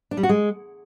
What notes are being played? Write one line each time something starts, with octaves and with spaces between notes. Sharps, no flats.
D4
G3
F#4
G#3